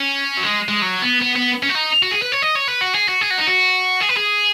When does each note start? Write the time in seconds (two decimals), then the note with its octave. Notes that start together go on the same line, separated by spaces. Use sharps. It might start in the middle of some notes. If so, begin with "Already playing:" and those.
Already playing: C#4
0.37 F#3
0.43 G#3
0.68 G#3
0.82 F#3
1.02 B3
1.22 B3
1.36 B3
1.63 C#4
1.69 F#4
1.75 D#4
2.02 F#4
2.11 G#4
2.22 B4
2.32 C#5
2.42 D#5
2.55 C#5
2.68 B4
2.81 F#4
2.95 G#4
3.09 F#4
3.21 G#4
3.31 F#4
3.38 D#4
3.48 F#4
4.01 G#4
4.09 B4
4.17 G#4